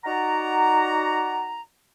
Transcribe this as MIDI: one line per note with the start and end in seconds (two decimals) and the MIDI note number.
0.05 1.61 63
0.05 1.61 66
0.05 1.61 74
0.05 1.61 78
0.05 1.61 82